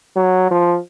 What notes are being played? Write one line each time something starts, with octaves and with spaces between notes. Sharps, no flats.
F#3
F3